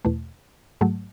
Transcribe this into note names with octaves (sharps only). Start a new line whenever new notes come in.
E2 B2 A3
G#2 F#3 A3